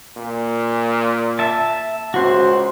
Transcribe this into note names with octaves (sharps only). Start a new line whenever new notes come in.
A#2
E5 A5
C#2 F#4 C5